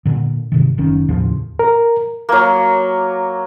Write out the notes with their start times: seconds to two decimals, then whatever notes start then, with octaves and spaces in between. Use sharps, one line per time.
0.05 A#2 D3
0.52 G#2 C3 D#3
0.78 F#1 D#3 C#4
1.09 D#2 A2 C#3 F3
1.59 A#4
2.29 F#3 A#3